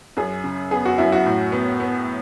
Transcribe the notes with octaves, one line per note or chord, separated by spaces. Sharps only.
F#2 G#4
C#3
B3 G#4
F#4
F#2 E4
F#4
A2
B3
B3